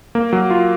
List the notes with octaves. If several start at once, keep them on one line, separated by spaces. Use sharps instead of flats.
A#3
F#3
F4